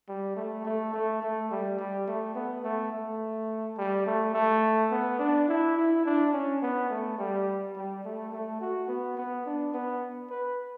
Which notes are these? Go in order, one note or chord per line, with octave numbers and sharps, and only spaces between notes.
G3
A3
A3
A3
A3
G3
G3
A3
B3
A3
A3
G3
A3
A3
B3
D4
E4
E4
D4
C#4
B3
A3
G3
G3
A3
A3
F#4
B3
B3
D4
B3
B4